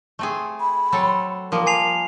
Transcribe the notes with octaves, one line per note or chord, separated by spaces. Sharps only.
A3 C4 G#4
B5
F#3 C4 A4
F3 G3 A#3 A#4
G#5 A5 C7 F7